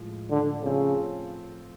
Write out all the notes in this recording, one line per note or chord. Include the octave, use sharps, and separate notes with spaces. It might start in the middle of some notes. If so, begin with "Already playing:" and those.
Already playing: A2 F3 G#3
D3
C#3 F3 A3 C4 F4